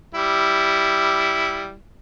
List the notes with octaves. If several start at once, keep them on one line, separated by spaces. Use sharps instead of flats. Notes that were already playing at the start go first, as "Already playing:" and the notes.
G3 E4